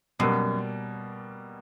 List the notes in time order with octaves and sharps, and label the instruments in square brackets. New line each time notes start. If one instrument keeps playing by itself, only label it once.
[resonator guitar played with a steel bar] F#2 [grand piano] B2 G3 A#3